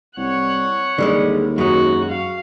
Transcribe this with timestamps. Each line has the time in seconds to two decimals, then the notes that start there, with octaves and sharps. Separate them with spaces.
0.17 C2 C#5 F#5
0.98 D#2 D3 G3 G#3
1.58 F#2 G#3 D#4 F#4
2.09 F5